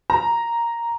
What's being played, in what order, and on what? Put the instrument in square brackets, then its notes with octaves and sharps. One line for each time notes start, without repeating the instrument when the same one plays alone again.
[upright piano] A#5